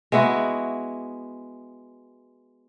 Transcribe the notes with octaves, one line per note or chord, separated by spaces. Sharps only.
G#3 B3 E4 F#4